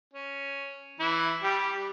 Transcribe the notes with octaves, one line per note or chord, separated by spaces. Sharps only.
C#4
E3 E4
G3 G4